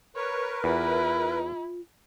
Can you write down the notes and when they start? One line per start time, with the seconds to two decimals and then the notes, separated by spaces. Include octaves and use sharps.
0.16 A#4 B4 C#5
0.64 E2 E4 F4